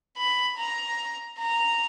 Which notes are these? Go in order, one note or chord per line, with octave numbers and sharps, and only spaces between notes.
B5
A#5
A#5